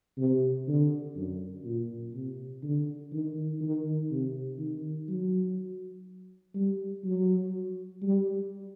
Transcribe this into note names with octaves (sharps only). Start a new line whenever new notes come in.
C3
D3
F#2
A#2
C3
D3
D#3
D#3
C3
D#3
F#3
G3
F#3
G3